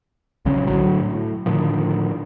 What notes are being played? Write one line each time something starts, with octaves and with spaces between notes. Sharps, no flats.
A#1 C#3 F#3 C#4
A2 D3 F#3
A2
A2 D3 D#3 F3